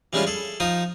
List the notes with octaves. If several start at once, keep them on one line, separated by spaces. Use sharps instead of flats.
E3 G3 G#3 C#4 E4 F4
G#4 A4
F3 D#4 F4 D#6